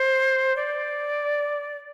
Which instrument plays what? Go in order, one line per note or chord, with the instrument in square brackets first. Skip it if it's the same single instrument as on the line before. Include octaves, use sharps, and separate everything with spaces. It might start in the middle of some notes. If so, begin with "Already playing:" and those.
Already playing: [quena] C5
D5